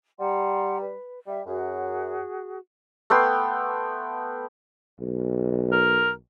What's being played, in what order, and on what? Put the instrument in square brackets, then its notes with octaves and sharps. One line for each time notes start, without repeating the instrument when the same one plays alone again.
[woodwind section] G3 [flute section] F#5 A#5 C6
[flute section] B4
[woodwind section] G3 [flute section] E5
[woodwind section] F#2 [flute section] F#4 G#4
[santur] A3 B3 G5 C6
[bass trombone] B1
[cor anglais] A#4